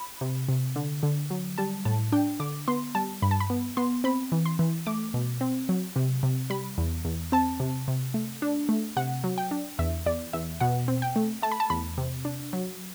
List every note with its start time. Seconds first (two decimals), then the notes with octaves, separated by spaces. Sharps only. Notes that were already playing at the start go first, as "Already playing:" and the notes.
Already playing: B5
0.21 C3
0.48 C3
0.76 D3
1.03 D3
1.30 F#3
1.58 G3 A5
1.85 A2 A5
2.12 D4 G5
2.40 D3 D6
2.68 B3 C6
2.95 G3 A5
3.22 G2 B5
3.31 A5
3.40 B5
3.50 B3
3.77 B3 C6
4.04 C4 B5
4.32 E3
4.46 C6
4.59 E3
4.86 A3 D6
5.14 B2
5.41 C4
5.69 F#3
5.96 C3
6.23 C3
6.50 G3 B5
6.78 E2
7.05 E2
7.32 C4 A5
7.60 C3
7.88 C3
8.14 A3
8.42 D4
8.69 A3
8.97 C3 F#5
9.24 F#3
9.38 G5
9.51 D4
9.79 E2 E5
10.06 E2 D5
10.33 E2 E5
10.60 B2 F#5
10.88 C4
11.02 G5
11.16 A3
11.42 A3 A5
11.52 B5
11.60 A5
11.70 E2 B5
11.98 C3
12.25 D4
12.53 F#3